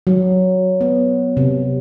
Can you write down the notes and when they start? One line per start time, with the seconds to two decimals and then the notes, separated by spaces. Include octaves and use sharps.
0.07 F#3
0.81 B3
1.37 C3